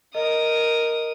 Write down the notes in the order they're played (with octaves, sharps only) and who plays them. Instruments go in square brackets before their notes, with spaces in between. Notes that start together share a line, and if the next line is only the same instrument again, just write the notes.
[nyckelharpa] A#4 [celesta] D#5 [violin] D#6